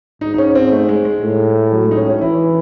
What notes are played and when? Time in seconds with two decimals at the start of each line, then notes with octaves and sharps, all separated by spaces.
0.21 G#2 D#4
0.34 D#4
0.38 C#4
0.55 C4
0.72 A3
0.89 G#3
1.05 G#3
1.22 A2
1.72 F#3
1.84 G#3
1.91 D#4
1.97 C#4
2.09 C#4
2.21 E3 E4